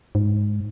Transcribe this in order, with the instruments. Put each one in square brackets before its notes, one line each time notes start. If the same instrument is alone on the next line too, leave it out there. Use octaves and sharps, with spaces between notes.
[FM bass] G#2